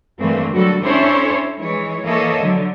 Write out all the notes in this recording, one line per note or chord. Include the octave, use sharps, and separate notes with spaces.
G2 D3 E3 A3 A#3 C4
D3 F#3 G3 F#4 A4
C#4 D4 E4 A4 C5 C#5
E3 G#3 C#5
E3 A#3 A4 C#5 D#5 E5
D3 F#3